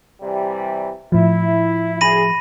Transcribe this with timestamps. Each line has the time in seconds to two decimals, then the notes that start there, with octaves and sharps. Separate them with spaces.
0.21 C3 E3 G3
1.12 A2 F3 E4
2.01 D2 E4 G#4 B5 A#6 D#7